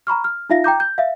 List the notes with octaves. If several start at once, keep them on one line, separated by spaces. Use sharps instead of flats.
A#5 B5 C#6 F6
F6
D#4 F4 E5 F5 A#6
G5 A#5 D6 G6
G6
E5 F5